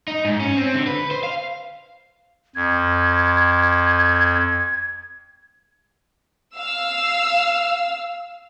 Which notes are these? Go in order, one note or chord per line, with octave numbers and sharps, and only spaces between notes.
D#4
G#2
C#4
C4
D3
B4
C5
F5
F2 G#6
F5 E6